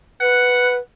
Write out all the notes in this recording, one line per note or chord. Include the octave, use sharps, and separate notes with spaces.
B4 F#5